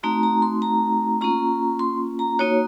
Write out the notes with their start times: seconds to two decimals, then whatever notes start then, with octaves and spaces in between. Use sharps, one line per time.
0.03 A3 C4 D#4 F#4 A#5
0.23 A#5
0.42 C6
0.62 A#5
1.21 A#3 C#4 F4 A#5
1.79 C6
2.19 A#5
2.39 A#3 D#4 F#4 C#5